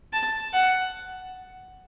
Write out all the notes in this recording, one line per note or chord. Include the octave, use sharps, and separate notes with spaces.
A5
F#5